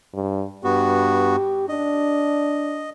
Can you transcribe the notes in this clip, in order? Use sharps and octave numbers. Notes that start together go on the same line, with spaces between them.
G2
G2 B3 F#4 G4
D4 D#5